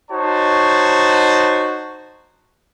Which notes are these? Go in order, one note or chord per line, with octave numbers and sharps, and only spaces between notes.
D#4 F#4 C5 C#5 A5